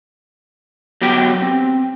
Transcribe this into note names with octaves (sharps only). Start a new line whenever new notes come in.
F#3 B3 G4 G5
C4